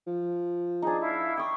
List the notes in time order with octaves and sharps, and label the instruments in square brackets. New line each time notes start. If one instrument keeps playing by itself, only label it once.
[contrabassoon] F3
[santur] D4 D#4 [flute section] G#4
[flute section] E4 F5
[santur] G5 C#6 [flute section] D#6